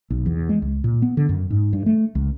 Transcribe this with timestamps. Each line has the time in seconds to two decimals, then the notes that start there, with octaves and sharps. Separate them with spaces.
0.10 B1
0.26 E2
0.49 G#3
0.62 C#2
0.84 A#2
1.02 B3
1.17 D3
1.29 F#2
1.50 G#2
1.73 G2
1.86 A3
2.15 C#2